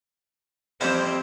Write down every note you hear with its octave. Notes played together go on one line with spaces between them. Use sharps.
F2 E3 G3 C4 C5